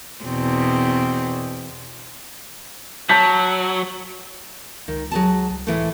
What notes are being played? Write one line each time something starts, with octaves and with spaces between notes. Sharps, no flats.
E2 B2 C4
F#3 A5 G6 B6
C#2 D#3
F#3 G#4 A5
C2
C#2 A2 E3 A3